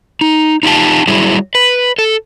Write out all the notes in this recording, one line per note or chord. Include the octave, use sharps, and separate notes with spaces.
D#4
D#4 F4 G4 G5 A5
F#3 G3 E4 F#4 G#4
B4
A4